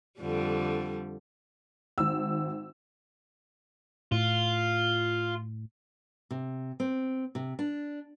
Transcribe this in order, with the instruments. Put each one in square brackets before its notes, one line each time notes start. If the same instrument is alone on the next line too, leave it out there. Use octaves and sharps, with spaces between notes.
[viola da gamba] F2 D3 G3
[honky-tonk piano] G#1 E6
[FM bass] A2 [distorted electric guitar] F4
[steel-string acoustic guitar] C3
C4
C3
D4